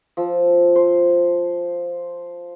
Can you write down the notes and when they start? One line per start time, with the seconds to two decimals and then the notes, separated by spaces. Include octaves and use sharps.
0.17 F3 E6
0.76 C5